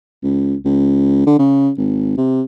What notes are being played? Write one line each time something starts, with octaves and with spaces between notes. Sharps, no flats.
C#2
C#2
D3
C#3
G#1
C3